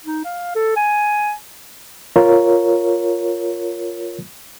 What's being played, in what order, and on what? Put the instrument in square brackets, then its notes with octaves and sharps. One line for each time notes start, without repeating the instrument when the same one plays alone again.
[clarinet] D#4
F5
A4
G#5
[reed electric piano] F4 A#4 C#5